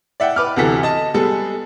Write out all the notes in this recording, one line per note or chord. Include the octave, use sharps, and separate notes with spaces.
D5 E5 F#5 G5
B4 D6 F6
D2 C3 E3 F#4 A4 B6
D#5 A5
G3 G#3 B3 A4